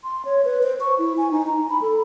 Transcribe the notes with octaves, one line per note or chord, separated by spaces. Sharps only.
C6
C#5
B4
C5
C#6
E4
G#5
D#4
A#5
B5
A4